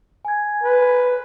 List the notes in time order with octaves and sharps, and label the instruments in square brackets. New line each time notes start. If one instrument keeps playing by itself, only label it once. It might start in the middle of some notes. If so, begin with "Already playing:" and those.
[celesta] G#5 G#6
[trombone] B4